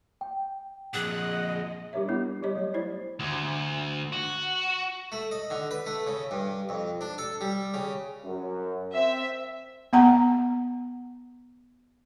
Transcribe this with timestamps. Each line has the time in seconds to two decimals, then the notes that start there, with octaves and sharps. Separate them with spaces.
0.21 G5
0.94 F2 A#2 G#4 D#5 F#5
1.93 G3 D4 G4 A#4 C#5 E5
2.09 G3 B3 E4
2.43 G3 G4 C#5 D#5
2.55 F#3 A3 C#5
2.74 E4 C5 D5
3.20 D2
4.13 F#4
5.12 A3
5.31 D#5
5.50 D3
5.71 B4
5.86 A3
6.07 C#3
6.31 G2
6.69 F2
7.01 D4
7.18 A4
7.41 G3
7.74 C#3
8.25 F#2
8.95 C4 E5
9.93 B3 F#5 A#5